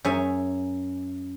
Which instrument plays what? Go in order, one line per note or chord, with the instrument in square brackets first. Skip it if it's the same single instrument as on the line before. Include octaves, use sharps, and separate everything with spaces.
[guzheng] F#2 G#4 C#5 E5 G#5